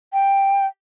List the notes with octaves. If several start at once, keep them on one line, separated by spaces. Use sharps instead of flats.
G5